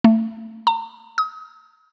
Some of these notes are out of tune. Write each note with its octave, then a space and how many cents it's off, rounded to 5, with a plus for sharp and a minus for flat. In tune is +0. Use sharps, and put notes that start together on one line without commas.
A3 +25
A#5 -40
D#6 +35